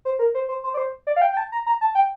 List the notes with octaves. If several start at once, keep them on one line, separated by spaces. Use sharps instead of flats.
C5
A#4
C5
C5
C5
D5
C5
D5
F5
G5
G5
A5
A#5
A#5
A5
G5